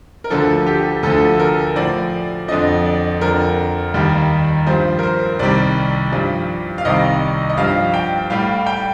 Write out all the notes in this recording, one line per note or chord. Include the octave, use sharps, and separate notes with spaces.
A#4
D2 D3 F3 A4
G4
D2 D3 F3 A4
A#4
A2 F3 D5
F2 D3 F3 D#5
D5
F2 D3 F3 A#4
D#2 D#3 G3
G2 F3 C5
A#4
C5
C2 C3 D#3 G3 D5
G2 F3
F5
C2 C3 D#3 G3 D#5
D#5
G2 F3 F5
G5
A2 G3 F5
G5